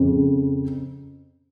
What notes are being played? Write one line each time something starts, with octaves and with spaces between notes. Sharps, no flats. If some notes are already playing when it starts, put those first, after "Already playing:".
Already playing: F2 C#3